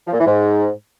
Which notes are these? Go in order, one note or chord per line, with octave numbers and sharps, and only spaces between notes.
F3
A#2
E3
G#2